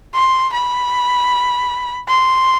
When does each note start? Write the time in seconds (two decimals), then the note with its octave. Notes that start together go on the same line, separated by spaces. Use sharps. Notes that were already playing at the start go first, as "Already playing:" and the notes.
0.14 C6
0.53 B5
2.08 C6